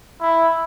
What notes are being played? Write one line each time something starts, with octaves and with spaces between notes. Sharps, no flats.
E4